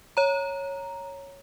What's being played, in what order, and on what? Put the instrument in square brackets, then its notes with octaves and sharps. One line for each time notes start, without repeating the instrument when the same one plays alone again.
[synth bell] C#5 A#5